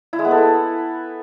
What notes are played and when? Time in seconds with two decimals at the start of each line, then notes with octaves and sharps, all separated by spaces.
0.13 E4
0.19 G#3
0.25 B3
0.31 A4